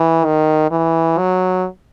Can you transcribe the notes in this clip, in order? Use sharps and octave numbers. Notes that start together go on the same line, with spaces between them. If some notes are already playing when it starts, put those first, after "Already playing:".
Already playing: E3
D#3
E3
F#3